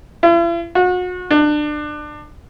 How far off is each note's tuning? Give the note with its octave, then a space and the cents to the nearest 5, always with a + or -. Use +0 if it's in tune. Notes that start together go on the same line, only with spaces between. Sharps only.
E4 +45
F#4 -35
D4 +25